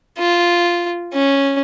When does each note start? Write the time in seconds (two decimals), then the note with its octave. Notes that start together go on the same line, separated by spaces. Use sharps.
0.18 F4
1.14 C#4